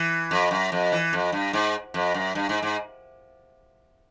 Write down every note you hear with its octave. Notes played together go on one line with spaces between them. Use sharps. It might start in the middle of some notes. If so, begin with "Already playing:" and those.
Already playing: E3
F2
F#2
F2
E3
F2
G2
G#2
F2
F#2
G2
G#2
G#2